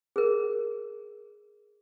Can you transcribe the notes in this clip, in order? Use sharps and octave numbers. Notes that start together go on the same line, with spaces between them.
G#4 A#4